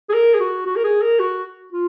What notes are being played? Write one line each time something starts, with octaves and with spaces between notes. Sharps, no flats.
G#4
A#4
G#4
F#4
F#4
A#4
G#4
A#4
F#4
F4